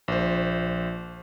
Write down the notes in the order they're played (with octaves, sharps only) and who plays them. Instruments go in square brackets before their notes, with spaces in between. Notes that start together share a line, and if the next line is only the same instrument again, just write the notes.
[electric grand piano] A#1 C5